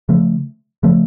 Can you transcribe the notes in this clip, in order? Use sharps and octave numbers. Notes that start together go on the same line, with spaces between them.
C#3 F3 A3
C#3 F3 A3